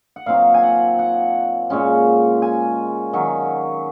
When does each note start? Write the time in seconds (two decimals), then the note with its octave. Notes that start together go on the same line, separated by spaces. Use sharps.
0.16 F#5
0.26 A#2 F#3 C4 D#4 F5
0.54 G#5
0.63 F#5
0.99 F#5
1.70 A#2 G#3 C#4
2.42 G#5
3.13 D#3 F#3 C#4